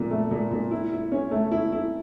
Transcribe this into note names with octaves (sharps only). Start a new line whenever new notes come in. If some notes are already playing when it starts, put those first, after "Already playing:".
Already playing: A#2 F3
A3
A#2
A#2
E4
E4
C#4
A3
E4
E4